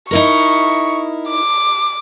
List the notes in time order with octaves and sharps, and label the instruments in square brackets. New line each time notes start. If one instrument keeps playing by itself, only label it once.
[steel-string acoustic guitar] D#4 E4 A#4 [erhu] C#6
[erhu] D6